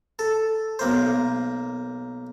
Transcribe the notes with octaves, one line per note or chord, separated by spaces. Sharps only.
A4
B1 A#3 C5